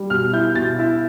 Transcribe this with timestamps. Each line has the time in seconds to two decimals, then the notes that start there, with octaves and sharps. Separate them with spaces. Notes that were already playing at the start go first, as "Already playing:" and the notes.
Already playing: G3
0.10 B2 F6
0.33 E4 G6
0.55 B2 A6
0.79 E4